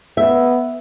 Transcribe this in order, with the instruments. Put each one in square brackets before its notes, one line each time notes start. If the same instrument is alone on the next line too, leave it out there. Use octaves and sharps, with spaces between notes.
[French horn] B3 [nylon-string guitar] E5